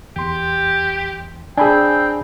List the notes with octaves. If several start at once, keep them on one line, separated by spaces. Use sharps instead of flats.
E2 G4 C6
C4 D4 G#4 G5 G#5 B5 E6